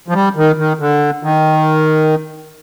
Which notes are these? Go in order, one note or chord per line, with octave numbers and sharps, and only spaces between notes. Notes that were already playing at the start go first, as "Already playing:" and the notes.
F3
G3
D#3
D#3
D3
D#3